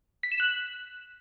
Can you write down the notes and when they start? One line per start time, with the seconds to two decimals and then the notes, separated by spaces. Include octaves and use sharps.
0.23 B6
0.32 E7
0.40 F#6